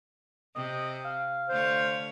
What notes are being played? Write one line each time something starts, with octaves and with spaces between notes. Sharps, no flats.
C3 C4 D#5
F5
D3 A3 C5 C#5